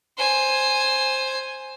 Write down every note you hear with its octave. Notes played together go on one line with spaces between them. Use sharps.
C5 G#5